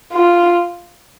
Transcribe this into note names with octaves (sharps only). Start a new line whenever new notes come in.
F4